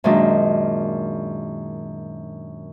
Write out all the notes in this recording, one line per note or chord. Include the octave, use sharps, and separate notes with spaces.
F#2 A#2 D#3 G#3 D4